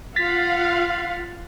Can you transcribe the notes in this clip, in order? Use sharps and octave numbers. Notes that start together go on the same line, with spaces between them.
F4 F5 F#5 A6 B6